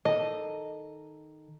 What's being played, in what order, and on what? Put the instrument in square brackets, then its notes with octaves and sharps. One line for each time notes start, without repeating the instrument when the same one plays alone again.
[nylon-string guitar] D#3 A4 A5 [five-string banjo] D#5